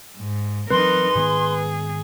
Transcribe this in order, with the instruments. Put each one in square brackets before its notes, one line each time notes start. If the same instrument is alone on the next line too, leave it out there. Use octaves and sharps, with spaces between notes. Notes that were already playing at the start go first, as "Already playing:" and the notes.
[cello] G#2
[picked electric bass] E3 F#3 C4 [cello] D#4 A#4 [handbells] B4 [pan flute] C6
[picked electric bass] G#2 D#3 B3 [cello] G#4